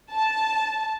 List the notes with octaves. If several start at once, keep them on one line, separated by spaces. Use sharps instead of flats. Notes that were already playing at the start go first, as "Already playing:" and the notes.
A5